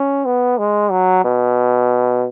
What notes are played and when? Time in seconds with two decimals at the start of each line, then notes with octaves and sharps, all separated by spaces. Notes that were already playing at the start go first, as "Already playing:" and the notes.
Already playing: C#4
0.26 B3
0.58 G#3
0.91 F#3
1.24 B2